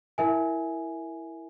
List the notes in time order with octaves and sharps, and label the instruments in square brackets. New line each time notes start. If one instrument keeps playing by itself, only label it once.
[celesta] E4 A#4 E5 G#5